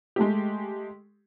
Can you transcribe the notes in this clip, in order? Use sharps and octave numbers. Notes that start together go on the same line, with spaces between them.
G#3 A3 G4